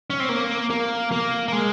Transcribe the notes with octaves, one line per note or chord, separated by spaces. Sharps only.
C#4
C4
A#3
A#3
A#3
A#3
G#3